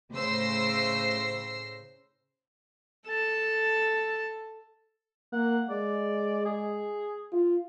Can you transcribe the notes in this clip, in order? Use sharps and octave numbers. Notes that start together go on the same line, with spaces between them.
A2 C#3 C5 E6 A#6 C7
A4 A5
A#3 F#5
G#3 D5
G#4
F4